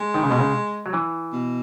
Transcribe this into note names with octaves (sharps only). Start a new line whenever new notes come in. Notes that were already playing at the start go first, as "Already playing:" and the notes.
Already playing: G#3
D#3
C#3
B2
C#3
F#3
E3
B2